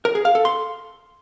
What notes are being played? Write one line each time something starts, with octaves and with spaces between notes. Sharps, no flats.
A#4
G#4
F5
A4
C6